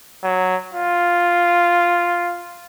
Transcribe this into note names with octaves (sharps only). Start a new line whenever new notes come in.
F#3
F4